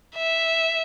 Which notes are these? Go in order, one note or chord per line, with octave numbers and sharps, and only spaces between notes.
E5